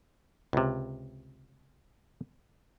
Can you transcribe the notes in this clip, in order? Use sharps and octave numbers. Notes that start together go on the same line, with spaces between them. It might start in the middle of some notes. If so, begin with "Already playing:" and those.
C#2 C3